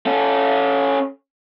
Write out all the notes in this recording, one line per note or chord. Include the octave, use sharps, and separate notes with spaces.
C#4 A4